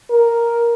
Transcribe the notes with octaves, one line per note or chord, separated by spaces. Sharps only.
A#4